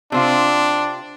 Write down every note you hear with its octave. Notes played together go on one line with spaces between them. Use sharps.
C3 C4 D4 F4